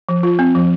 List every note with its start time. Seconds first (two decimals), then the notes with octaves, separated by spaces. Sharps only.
0.09 F3
0.23 F4
0.39 C4
0.55 F3